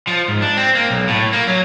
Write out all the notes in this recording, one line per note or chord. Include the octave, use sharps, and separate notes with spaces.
F3
G#2
D4
C4
A#3
B1
A2
A#3
F#3